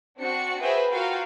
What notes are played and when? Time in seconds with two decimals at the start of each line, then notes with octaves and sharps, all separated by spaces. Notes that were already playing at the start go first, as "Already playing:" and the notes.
0.18 C4 D4 F#4 C#7
0.61 F#4 G#4 B4 C5 E5 G5
0.90 F4 F#4 A#4 F5 G5